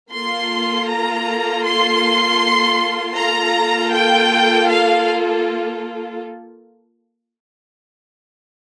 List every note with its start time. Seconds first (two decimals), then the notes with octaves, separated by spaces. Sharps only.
0.13 A#3 F4 A4 C6
0.89 A#5
1.65 C6
3.16 A#3 F4 A4 A#5
3.92 G5
4.68 F5